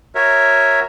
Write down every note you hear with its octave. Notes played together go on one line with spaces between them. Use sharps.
F#4 A#4 C#5 E5